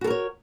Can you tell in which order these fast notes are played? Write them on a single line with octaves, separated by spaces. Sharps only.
F#4 A4 A#4 C#5